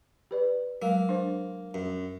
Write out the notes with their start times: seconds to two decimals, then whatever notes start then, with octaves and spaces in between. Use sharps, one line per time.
0.31 G4 B4 D5
0.82 F#3 G#3 A#3
1.09 D4 C5
1.74 F#2